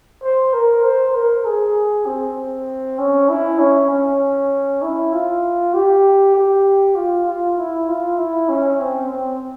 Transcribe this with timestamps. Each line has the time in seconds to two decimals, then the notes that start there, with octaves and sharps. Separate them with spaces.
0.23 C5
0.54 A#4
0.84 C5
1.15 A#4
1.46 G#4
2.06 C4
2.99 C#4
3.29 E4
3.59 C#4
3.91 C#4
4.83 E4
5.13 F4
5.74 G4
6.35 G4
6.96 F4
7.26 F4
7.58 E4
7.88 F4
8.18 E4
8.49 C#4
8.80 C4
9.10 C4